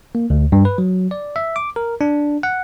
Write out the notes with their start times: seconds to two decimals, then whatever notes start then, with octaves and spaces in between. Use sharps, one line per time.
0.15 A#3
0.30 D2
0.52 G2
0.65 B4
0.78 F#3
1.11 D5
1.36 E5
1.56 D6
1.76 A#4
2.01 D4
2.43 F#5